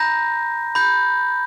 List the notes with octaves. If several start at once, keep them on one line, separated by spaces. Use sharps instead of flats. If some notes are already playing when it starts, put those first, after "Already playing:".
Already playing: A#5 B5 G6 A#6
B5 G6